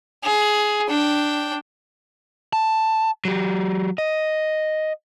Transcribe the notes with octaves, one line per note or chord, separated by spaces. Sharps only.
G#4
D4 G5
A5
F#3 G4
D#5